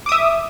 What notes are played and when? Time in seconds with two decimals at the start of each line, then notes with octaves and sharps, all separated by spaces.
0.06 D6
0.09 D#6
0.12 E5